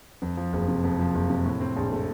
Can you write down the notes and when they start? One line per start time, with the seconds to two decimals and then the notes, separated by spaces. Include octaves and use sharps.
0.22 F2
0.37 F3
0.53 F#1
0.68 C3
0.84 F2
0.99 F3
1.15 F#1
1.30 C3
1.46 A2
1.61 C4
1.76 A#1
1.92 A3